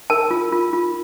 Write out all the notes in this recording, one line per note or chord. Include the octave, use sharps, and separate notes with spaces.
A#4 A5
F4
F4
F4